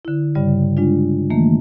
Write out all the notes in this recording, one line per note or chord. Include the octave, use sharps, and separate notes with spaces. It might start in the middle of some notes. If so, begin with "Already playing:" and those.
D3 E4
G2 C#3 G3 D5
G#3 D4 F4
D#3 E3 A3 A#3